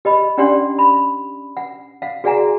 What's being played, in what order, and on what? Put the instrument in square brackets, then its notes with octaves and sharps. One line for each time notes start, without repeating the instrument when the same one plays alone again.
[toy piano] G4 D#5 B5
C#4 D4 G4 D5 F#5 C6
B5
F#5
F5 F#5
F#4 G#4 D5 F#5 G#5 A#5